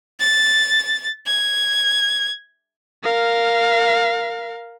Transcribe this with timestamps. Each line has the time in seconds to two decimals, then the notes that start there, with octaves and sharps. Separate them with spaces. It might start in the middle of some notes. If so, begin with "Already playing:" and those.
0.20 A6
1.27 G#6
3.04 A#4 F5